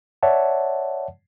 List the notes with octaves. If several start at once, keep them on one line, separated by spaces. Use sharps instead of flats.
C#5 D5 E5 F#5 A5